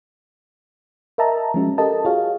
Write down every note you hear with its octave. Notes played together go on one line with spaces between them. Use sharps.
A#4 D#5 E5 A5 A#5
F3 G#3 C#4 F#4
G4 A4 A#4 D#5 A5
F4 F#4 G#4 C#5 F5